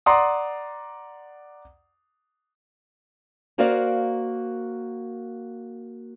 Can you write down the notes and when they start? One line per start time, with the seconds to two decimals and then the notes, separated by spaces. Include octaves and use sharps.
0.06 D5 F#5 A#5 C6 D#6
3.58 A#3 F#4 A#4 C5 D5 F5